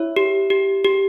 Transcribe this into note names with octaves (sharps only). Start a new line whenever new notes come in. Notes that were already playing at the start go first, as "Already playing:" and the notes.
Already playing: E4 C#5
G4
G4
G4